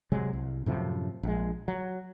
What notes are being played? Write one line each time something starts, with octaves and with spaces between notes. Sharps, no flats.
C3 F#3 G#3
C2
F#2 A2 C3 F3
A#1 G#3
F#3